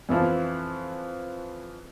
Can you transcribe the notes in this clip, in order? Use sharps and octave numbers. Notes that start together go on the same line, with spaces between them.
F2 E3 F3